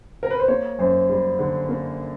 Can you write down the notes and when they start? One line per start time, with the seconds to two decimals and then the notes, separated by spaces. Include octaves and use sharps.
0.23 A#4
0.30 B4
0.40 C5
0.48 A#3 C#5
0.79 F#2 C5
1.09 G3
1.39 D3
1.69 A#3